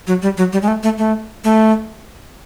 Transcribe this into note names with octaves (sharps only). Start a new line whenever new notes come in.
F#3
G3
F#3
G3
G#3
A3
A3
A3
A3